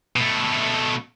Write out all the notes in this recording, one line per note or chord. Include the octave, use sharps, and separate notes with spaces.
B2 A3